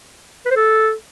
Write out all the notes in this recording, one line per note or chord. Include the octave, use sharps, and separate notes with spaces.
B4
C5
A4